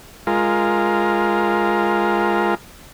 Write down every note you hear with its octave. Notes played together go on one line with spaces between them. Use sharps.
G#3 F4 A#4